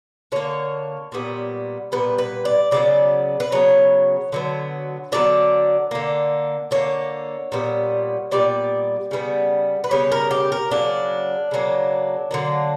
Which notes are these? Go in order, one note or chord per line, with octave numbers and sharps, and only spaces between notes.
D3 A#3 C#5
A#2 G3 B3
A#2 G3 B3 B4
B4
D5
C#3 F#3 B3 D5
B4
C#3 F#3 B3 C#5
D3 F#3 B3
D3 F#3 B3 D5
D3 A#3
D3 A#3 C#5
A#2 G3 B3
A#2 G3 B3 D5
C#3 G3 B3
B4
C#3 G3 B3 C#5
A#4
G4
A#4
C#3 F#3 A#3 D4
C#3 F#3 A#3
D3 F#3 A#3